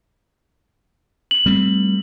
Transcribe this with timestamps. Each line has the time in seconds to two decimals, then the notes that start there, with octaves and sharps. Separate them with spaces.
1.31 F#7
1.46 G3 A3 C4